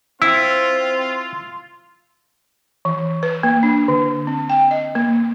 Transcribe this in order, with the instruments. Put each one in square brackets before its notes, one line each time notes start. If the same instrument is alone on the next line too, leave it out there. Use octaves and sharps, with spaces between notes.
[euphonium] C4 [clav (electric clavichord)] E4 [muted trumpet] F4 [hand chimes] E6
[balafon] E3
B4
A#3
D4
D3
C4
G5
D#5
A#3